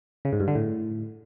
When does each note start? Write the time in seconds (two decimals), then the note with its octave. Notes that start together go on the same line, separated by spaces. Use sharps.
0.25 C#3
0.32 G#2
0.40 G2
0.48 D3
0.55 A2